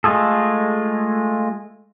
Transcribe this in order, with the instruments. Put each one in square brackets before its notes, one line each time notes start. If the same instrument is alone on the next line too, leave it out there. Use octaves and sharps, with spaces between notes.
[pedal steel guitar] G#3 A3 F4 G#4 A4